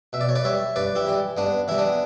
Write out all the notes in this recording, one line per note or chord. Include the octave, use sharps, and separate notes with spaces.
B2 E5
D5
C#5
B4 D5
G3 C#5 E5
G2 B4 D5
E4 G4
E3 G3
G2 B3 D4
E3 G3 E4
B3 D4